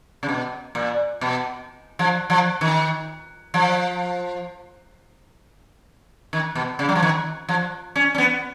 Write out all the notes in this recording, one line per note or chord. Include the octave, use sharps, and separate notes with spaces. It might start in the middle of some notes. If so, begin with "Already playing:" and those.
C#3
B2
A#2
B2
F3
F3
D#3
F3
D#3
B2
C#3
F#3
F3
D#3
F3
C#4
C#4
B3